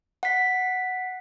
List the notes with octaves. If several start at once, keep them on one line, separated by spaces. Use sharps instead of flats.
F#5 B6